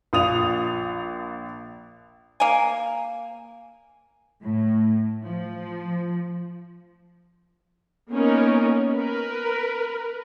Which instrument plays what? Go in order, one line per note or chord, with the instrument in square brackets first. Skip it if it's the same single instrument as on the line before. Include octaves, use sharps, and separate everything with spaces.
[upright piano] A#1 F4 D#6 F7
[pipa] A#3 G#5
[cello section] A2
F3
[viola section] A#3 B3 C#4 D#4 A#4
A#4 B4